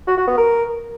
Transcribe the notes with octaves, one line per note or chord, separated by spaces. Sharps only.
F#4
F#4
B3
A#4